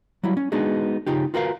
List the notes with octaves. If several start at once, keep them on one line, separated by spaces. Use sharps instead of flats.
F#3 G3 E4
C#4
G#3 B3 D4 D#4 F#4 G#4
C#3 D#4 F4 G4
F4 F#4 A#4 B4 D5 F5